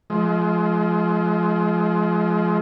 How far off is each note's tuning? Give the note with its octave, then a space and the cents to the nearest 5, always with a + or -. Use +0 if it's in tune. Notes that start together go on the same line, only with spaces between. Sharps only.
F3 -5 G#3 +35